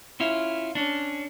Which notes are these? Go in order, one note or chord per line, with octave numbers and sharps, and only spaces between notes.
C#4 E4 F4
C#4 D4